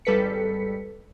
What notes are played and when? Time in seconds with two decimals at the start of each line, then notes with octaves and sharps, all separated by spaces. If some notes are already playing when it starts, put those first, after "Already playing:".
0.05 G#1 G3 A4 B4 B6 C#7